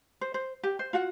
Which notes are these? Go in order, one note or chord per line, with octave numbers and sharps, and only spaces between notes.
C5
C5
G4
C5
F4 F#4 F#5